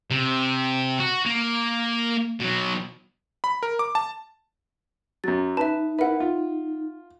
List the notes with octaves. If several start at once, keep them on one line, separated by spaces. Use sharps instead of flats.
C3
F#4
A#3
B2 F#3
B5
A#4
D6
A5
F#2 F#3 A6
D#4 B4 E5 A5
E4 A#4 B4 E5 F#5
F4